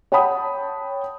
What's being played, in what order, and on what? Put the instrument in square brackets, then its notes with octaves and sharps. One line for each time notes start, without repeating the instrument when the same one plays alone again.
[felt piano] C#5 F#5 G5 A5 B5 D#6